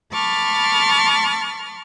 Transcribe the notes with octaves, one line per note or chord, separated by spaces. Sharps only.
A5 B5 C#6 D6 F6 A6